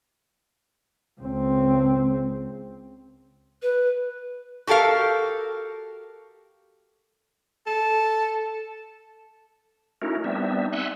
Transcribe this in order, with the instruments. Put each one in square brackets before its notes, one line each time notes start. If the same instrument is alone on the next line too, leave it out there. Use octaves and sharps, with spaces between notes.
[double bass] C#2 C4
[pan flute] B4
[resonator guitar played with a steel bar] F#4 G4 A4 A#4 F5
[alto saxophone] A4 [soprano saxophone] A5
[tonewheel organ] A3 C#4 D#4 E4 F#4 A#4
G3 B3 C4 D4 D#4 E5
E5 F#5 G#5 C6 E6 F#6